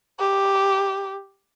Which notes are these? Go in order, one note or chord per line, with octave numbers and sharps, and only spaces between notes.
G4